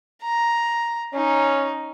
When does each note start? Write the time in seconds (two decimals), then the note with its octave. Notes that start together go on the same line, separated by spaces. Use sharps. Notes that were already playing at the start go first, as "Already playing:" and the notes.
0.22 A#5
1.14 C#4 D#4